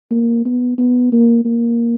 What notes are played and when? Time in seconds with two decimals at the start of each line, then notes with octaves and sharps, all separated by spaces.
0.11 A#3
0.45 B3
0.78 B3
1.12 A#3
1.45 A#3